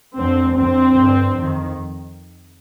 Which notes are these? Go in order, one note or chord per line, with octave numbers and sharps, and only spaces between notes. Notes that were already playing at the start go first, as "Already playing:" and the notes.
F2 D3 C4
F2 D3 C4
G2 D3
F2 D#3